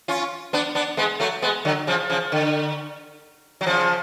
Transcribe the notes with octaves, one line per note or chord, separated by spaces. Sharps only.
C#4 F4
B3 D4
B3 D4
G#3 B3
F#3 A3
G#3 B3
D3 F#3
C#3 F3
C#3 F3
D3
F#3
C#3 F3